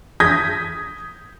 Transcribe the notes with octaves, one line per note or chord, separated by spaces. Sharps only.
D#6 G6 G#6 A#6 B6